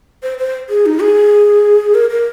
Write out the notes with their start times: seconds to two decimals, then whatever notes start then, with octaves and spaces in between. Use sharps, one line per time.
0.23 C5
0.39 C5
0.69 G#4
0.86 D#4
1.01 G#4
1.95 A#4
2.10 A#4